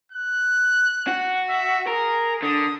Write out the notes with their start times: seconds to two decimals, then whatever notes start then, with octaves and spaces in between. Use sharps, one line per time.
0.12 F#6
1.07 F#4
1.49 E5
1.87 G#4 A#4
2.43 D3 D#6